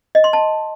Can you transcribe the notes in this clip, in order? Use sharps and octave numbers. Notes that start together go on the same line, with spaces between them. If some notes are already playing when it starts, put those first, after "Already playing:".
D#5
C6
A5